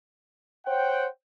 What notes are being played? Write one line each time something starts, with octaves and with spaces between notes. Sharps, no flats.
C5 C#5 F#5 G5